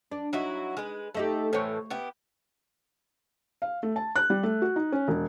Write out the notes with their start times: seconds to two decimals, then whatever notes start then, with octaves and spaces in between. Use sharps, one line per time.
0.12 D4
0.33 F#3 D#4 E4 F#4
0.77 G#3 B4
1.14 A3 D#4 G4 A4
1.53 A2 E3 C5 C#5
1.90 B3 E4 G4
3.62 F5
3.83 A3
3.96 A5
4.16 F#6
4.30 G3
4.43 A3
4.62 F#4
4.76 D#4
4.92 C#4
5.08 E1